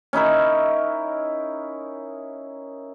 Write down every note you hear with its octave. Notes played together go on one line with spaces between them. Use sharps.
C#4 D#4 E4 A#4